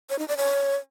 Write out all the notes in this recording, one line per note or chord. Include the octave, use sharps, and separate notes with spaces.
C#5
D#4
D5
C#5